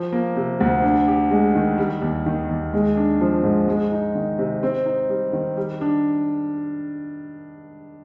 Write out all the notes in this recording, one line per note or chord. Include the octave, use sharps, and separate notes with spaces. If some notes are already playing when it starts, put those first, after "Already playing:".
Already playing: F3
A#3
C3
D2
D4
G4
G#3
D#3
G3
D#2
D#3
D#2
G#3
D4
F3
G#2
G#3
D#4
D#3
C3
C4
D#4
G3
D#3
G3
D4